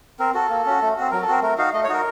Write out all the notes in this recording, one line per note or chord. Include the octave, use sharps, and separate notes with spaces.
C4 A#4
F#4 A4
A#3
C#4 F#4
A3
C4 F#4
F#3 A#4
A4
C4 F#4 A#4
A3 A#4
D#4 F#4 F5
A3 D#5
C#5
D#4 F#4 A#4